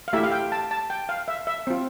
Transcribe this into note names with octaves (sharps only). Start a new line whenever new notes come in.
F5
A3 E4 G4 E5
F5
G5
A5
A5
G5
F5
E5
E5
C4 F4